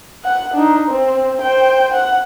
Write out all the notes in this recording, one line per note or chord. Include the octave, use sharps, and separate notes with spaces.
F#5
D4 D#4
C4
C5 G5
F#5